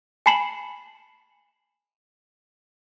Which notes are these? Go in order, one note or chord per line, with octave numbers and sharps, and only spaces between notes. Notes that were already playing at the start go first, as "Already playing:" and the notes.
G#5 A5 B5 C7 E7 F#7